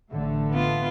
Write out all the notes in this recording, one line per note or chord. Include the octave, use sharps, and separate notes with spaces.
A1 D3 A3
B3 F4